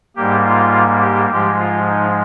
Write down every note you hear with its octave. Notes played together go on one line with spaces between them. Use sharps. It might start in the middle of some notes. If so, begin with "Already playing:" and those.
G#2 G3 A#3 G4
F4
G4
G#2 F3 G#3 G4
F4
D#4